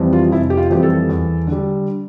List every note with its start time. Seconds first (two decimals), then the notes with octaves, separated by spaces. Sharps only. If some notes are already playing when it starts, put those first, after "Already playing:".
Already playing: F2 E3 G3
0.13 F4
0.32 F1 E4
0.50 G4
0.57 F4
0.70 F2 E3 G3 G4
0.83 A4
1.09 E2
1.47 D3
1.52 G3